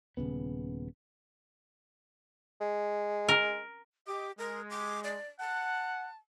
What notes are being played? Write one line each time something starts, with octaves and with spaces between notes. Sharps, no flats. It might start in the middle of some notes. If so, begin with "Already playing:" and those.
D#1 G#1 C#3 B3
G#3
A#4
G4 D#5 D6
G#3 A#4
D6
D5
F#5 A5